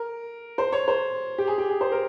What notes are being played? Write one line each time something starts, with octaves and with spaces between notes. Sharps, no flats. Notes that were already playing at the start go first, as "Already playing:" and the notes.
Already playing: A#4
C5
C#5
C5
G4
G#4
G4
G#4
C5
A#4